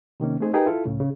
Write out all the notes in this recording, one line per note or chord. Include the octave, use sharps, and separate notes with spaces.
C3 D#3 A#3 C#4
A3 C4 D#4 G#4 C5
D#4 G4 G#4 A#4 B4 G5
E4 F4 A4
C#2 A2 C#3
C#3